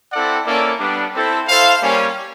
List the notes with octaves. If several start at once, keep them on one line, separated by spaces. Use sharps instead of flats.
C4 E4 A4 D5 F#5
A#3 C#4 E4 A4 D5
G3 B3 D4
C4 E4 A4 C5
E4 A4 C5 F5
G3 A#3 C#4